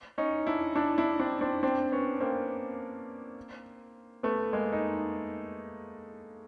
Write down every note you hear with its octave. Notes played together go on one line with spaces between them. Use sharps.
C#4 D#4
D4 E4
D4 E4
D4 E4
C4 D4
C4 D4
C4 D4
B3 C#4
A#3 C4
A3 B3
G#3 A#3
D#4